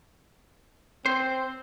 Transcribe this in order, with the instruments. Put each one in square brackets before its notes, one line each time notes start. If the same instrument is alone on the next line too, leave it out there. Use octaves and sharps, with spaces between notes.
[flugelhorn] C4 [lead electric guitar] C5